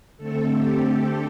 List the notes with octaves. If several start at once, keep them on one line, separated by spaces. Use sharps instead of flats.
D3 A3 C4 A4
G4
A4